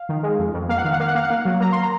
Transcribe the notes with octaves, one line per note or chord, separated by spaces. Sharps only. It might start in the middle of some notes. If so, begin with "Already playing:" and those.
Already playing: F5
D#3
G#3
F2
F2
A#3 F5
F#5
D#3 F5
F#5
A#3 F5
F#5
A#3 F5
F#5
A#3 F5
F#3
A#3 A#5
C6
A#5